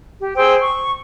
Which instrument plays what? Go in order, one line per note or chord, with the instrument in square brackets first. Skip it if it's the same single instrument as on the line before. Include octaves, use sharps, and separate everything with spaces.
[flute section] G4
G#4 C5 G5 E6
C#6